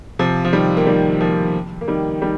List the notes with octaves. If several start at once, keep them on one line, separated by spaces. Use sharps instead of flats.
C3 F3
F3
D#3 G3
A#3
D#3 G3
F3 A#3
A#3
D#3 G3
D#3 G3